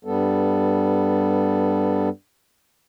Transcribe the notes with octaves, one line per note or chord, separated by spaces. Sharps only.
G2 G3 B3 A4